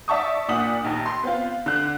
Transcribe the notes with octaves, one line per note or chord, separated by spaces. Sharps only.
D5 E5 A5 C#6 D#6
A#2 D4 F#5 D#6 B6 F#7
A#1 D#2
C6
B3 C4 F4
D3 F#6